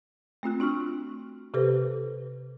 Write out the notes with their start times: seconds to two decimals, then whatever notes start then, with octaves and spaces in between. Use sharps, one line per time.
0.43 A3 C4 F4 F#6
0.60 D4 F#4 C#6 F6
1.54 C3 G4 A4 B4 C5